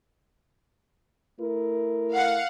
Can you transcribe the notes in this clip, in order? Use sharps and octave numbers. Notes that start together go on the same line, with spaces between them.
A3 E4 A#4
F5 F#5